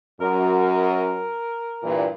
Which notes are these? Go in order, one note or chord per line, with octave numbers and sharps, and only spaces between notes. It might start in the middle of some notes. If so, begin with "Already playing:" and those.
F#2 A#4
A#4
G2 A#2 E3